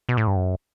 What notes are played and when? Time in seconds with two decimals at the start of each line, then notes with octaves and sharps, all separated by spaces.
0.09 B2
0.17 A2
0.27 G2
0.36 F#2